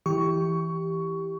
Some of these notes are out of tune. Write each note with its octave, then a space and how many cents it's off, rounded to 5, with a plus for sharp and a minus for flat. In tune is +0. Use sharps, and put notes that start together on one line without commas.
E3 +0 G4 +0 C#6 +15